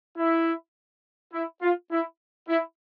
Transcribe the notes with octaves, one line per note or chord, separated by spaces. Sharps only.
E4
E4
F4
E4
E4